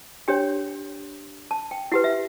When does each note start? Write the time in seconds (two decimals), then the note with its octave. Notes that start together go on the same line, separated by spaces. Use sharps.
0.28 D4 G4 C#5 G5
1.51 A5
1.71 G5
1.92 E4 G4 B4 F#5
2.04 E5